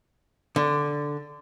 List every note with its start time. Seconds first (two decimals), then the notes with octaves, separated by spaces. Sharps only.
0.56 D3